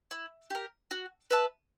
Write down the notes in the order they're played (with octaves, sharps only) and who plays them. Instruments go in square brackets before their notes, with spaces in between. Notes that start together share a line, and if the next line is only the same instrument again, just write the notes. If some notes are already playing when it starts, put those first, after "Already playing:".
[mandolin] E4
G4 A#4
F#4
B4 E5 A5